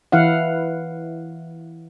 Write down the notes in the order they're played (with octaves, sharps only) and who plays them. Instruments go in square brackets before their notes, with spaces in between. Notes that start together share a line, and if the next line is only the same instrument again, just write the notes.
[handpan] E3 E4 F5 F#5